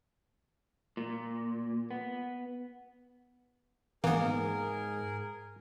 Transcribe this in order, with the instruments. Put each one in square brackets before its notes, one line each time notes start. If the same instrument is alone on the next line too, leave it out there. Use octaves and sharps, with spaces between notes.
[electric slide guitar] A#2
B3
[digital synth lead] G#2 [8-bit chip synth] E3 B3 [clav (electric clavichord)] A#3 [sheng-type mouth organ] G#4 A#4